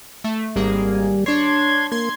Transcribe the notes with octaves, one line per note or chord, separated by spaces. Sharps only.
A3
G#1 G3 A#3 G#4
D4 C#5 C6 G#6
A#3 C6 G#6